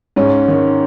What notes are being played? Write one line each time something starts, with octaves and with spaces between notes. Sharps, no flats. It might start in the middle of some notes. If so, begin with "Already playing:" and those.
G#2 C#4
D#3